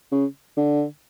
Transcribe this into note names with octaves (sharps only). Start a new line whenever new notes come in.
C#3
D3